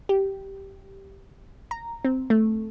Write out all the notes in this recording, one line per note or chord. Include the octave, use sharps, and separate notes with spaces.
G4
A#5
C4
A3